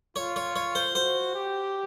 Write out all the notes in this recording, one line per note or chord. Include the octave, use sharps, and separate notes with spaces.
F4 C#5
C#5
C#5
C5
F#4 C5
G4